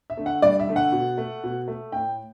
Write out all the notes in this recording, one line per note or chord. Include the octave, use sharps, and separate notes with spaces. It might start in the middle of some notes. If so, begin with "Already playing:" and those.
E5
D3 A3
F#5
G2 D5
E5
D3 A3
F#5
B2
A3
B2
A3
A2 G5